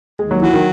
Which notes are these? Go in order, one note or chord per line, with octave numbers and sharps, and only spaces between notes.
D#2 G#3
F#3
E3 F#3
D#3